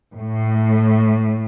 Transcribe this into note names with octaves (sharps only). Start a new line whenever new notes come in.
A2